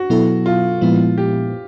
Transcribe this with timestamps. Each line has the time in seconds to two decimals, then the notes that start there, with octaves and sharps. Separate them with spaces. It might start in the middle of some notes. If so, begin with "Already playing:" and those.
Already playing: F#4
0.10 B2 F#3 B3 E4 A4
0.46 F4
0.81 A#2 F3 G#3 B3 E4
1.18 G4